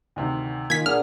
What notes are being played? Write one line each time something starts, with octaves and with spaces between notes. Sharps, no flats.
D2 C3 D#3
D#3 A#3 F4 G#5 G#6 B6
A#2 D4 G#4 F#5 F6